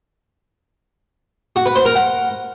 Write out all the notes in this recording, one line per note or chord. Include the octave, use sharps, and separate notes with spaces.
F#4
B4
C5
A#4
F#5